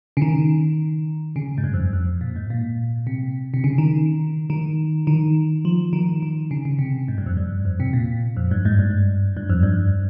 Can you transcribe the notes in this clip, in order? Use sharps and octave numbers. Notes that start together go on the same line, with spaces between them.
C#3
D#3
C#3
G#2
G2
F2
F2
A#2
G#2
A#2
C3
C3
C#3
D#3
D#3
D#3
F3
D#3
D#3
C#3
C#3
C3
G#2
G2
F2
G2
F2
C3
A#2
F2
G2
G#2
G2
G2
F2
G2